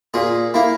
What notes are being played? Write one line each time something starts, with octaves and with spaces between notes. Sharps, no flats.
A#2 G#4
A#3 E4